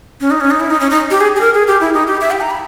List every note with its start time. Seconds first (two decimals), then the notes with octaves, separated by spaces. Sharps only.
0.21 C#4
0.31 D#4
0.41 C#4
0.51 D#4
0.60 E4
0.70 D#4
0.80 C#4
0.90 D#4
1.11 G4
1.21 G#4
1.36 G#4
1.41 A#4
1.54 G#4
1.67 G4
1.81 E4
1.94 D#4
2.07 G4
2.21 E5
2.31 G5
2.41 A#5
2.50 B5